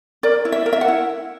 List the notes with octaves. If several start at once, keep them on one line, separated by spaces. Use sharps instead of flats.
A#4 D5
E4
E5
A#4
E5
F#5
E4